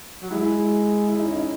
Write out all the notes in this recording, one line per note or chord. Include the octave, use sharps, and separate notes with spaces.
F#3
G#3 E4
E4
D#4
C#4
D#4